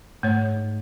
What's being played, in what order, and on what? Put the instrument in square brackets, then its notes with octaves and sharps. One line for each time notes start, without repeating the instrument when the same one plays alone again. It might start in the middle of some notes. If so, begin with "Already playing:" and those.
[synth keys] G#2 [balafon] A3 C#5